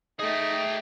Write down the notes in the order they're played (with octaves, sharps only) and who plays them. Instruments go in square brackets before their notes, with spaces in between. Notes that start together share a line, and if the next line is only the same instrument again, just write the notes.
[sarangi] A3 [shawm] D#4 [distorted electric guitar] G#4 G5 [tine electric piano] D#5